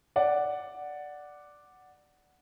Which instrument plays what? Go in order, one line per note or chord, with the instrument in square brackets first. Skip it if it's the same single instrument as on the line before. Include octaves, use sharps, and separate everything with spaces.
[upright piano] D5 F#5